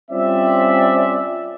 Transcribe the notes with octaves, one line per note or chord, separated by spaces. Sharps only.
G3 C4 C#4 F4 D5 E5